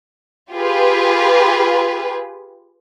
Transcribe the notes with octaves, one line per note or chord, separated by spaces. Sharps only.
F4 G4 G#4 B4